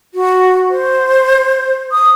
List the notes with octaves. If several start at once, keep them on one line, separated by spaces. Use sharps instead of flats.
F#4
C5
D#6